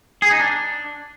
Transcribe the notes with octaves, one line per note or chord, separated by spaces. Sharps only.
G#4
D#4
D4